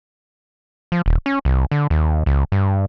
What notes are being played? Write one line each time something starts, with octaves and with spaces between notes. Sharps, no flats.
F3
D#1
C#4
C2
D3
D#2
C#2
G2